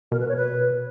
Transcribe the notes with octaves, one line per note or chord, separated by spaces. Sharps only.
B2 A#4
B4
C#5
B4